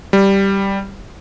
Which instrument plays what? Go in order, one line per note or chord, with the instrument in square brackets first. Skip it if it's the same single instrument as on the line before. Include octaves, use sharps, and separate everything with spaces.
[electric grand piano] G3